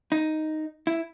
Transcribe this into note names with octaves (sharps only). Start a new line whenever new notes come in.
D#4
E4